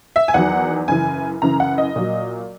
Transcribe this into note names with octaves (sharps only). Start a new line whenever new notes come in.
E5
G#5
E2 D#3 F#3 F#5
F#2 C#3 E3 G#5
F#2 C#3 E3 A#5
F#5
D#5
A#2 F#3